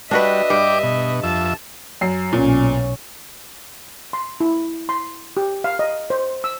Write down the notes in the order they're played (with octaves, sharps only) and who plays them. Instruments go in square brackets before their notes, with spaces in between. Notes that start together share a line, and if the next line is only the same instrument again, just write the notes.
[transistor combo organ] G3 [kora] D4 F#4 B4 [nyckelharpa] D#5 E5
[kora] G2 [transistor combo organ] G4 D5 D6
[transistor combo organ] B2
[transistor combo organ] F2 E5 [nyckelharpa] A5
[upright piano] F#2 C7
[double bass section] B1 C#4 [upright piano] A#2
[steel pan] C6
E4
C6
G4
F5
D#5
C5
E6